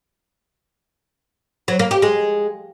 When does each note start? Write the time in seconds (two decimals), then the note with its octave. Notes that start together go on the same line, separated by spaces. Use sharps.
1.68 F#3
1.79 A#3
1.91 G4
2.02 G#3